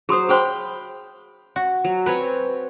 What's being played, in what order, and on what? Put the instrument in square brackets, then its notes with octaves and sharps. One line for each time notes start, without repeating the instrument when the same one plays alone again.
[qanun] F#3 C5 [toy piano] G#4 C6 D#6
[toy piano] G#4 C5 C6 [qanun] F5 G5 B5
[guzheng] F#4
[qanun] F#3
[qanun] C4 C#5 G#5 [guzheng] B4